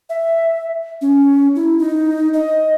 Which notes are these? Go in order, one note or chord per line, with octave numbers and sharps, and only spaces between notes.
E5
C#4
E4
D#4
D#5